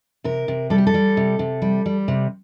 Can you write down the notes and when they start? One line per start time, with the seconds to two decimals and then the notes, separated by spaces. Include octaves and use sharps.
0.24 C3 A#4
0.48 C3
0.70 G3 A4
0.78 G4
0.87 A4
0.94 G3
1.17 C3
1.39 C3
1.62 G3
1.86 G3
2.08 C3